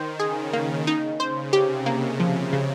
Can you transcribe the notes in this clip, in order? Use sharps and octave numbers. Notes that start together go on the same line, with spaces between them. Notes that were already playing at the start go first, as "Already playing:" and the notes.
Already playing: D#3 C5
C#3 G#4
A#3
D#4
C#3 C5
C3 G4
A#3
F3
C#3